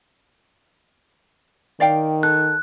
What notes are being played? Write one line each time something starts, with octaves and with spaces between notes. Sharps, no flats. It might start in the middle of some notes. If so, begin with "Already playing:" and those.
D#3 D5 F5 G5
A4 F#6